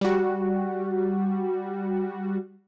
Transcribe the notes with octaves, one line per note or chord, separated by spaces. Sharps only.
G3 F#4